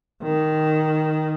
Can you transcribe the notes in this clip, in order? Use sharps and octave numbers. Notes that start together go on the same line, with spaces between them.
D#3